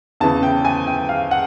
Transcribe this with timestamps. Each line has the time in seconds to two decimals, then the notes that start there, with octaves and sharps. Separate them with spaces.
0.20 E2 C#3 E3 A5
0.43 G5
0.65 G#5
0.87 G5
1.09 F5
1.31 F#5